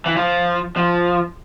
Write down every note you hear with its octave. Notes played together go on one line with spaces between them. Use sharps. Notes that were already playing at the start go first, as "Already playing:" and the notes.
E3
F3
F3